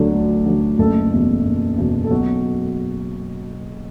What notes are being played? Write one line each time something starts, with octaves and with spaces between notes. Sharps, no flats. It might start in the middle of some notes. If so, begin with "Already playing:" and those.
Already playing: D2 D3 F#3 D4
D2
D3 F#3
F#1 A3 A4
E2 B2
F#1
E2 B2
A4
B1 F#3 F#4